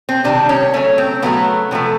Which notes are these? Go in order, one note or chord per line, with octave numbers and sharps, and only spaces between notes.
C4
C3 D#3 G3 D4
C#4
C#3 F#3 A3 C#4
C4
C#3 F#3 A3 B3
C3 F3 A3